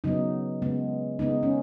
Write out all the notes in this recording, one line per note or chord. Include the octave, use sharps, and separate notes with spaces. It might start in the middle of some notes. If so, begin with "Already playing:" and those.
C#3 F#3 B3 D#4
C#3 G#3 B3
C#3 G#3 B3 D#4
C#4